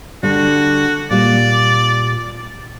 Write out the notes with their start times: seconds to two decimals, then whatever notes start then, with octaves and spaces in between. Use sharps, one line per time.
0.23 D3 G3 F#4
1.10 A#2 G3 D5